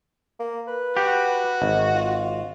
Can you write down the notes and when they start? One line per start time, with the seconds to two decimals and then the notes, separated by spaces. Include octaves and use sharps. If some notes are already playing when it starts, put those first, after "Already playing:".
0.39 A#3
0.67 B4
0.97 F#4 G4
1.62 G#1
1.94 F4